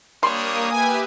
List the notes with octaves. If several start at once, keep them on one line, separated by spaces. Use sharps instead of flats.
G3 A#3 D4 C#5 C6 D#6
G4 B4 E5 G#5